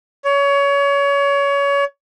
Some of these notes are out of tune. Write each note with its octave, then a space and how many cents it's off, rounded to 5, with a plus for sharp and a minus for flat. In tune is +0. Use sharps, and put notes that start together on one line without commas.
C#5 +25